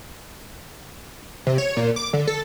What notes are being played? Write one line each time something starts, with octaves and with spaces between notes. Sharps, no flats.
C3
C#5
A#2
D6
D3
A4